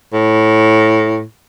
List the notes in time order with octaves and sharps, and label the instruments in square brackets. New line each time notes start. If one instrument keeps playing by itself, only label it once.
[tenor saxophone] A2